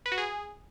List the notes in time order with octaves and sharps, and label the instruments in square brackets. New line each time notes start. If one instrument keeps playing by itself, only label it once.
[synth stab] B4
F#4
G#4